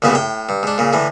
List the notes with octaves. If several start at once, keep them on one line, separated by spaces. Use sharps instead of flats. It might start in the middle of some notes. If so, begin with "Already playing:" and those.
C2 A#2 C#3 B3 F#4
A2 G5
G2
G#2 D4
A#2 C#3
A2 D3 E3